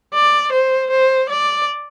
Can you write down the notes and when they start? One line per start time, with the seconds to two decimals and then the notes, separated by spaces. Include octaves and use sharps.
0.14 D5
0.52 C5
0.91 C5
1.30 D5